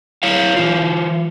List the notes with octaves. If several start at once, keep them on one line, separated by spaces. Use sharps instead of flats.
E4 C#5 F5
E3 F4